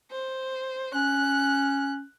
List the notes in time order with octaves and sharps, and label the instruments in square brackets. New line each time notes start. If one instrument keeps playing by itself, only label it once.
[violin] C5
[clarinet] C#4 [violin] F#6